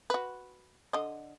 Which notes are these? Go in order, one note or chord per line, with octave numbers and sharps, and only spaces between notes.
F#4 B4
D3 D#5